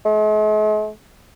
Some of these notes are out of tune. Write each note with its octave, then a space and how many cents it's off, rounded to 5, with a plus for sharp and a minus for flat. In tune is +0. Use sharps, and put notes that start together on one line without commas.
G#3 +45